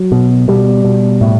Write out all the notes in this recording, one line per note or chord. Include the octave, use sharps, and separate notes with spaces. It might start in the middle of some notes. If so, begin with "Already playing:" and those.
Already playing: F#3
B2
B2 G3
B2
A2